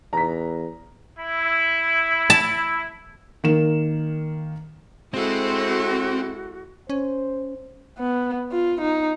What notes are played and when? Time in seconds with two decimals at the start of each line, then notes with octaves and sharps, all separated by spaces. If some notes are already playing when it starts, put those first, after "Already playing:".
0.13 E2 A#5 B6
1.19 E4
2.30 A5
3.44 D#3 A#3 E7
5.14 G#3 C4 E4 F#4 A4
6.89 C#4 C5
7.98 B3
8.52 F4
8.81 D#4